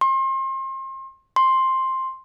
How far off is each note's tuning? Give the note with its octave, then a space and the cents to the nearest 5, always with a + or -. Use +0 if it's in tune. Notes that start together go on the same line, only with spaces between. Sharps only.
C6 +35
C6 +10